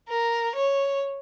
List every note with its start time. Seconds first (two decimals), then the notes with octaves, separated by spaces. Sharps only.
0.08 A#4
0.56 C#5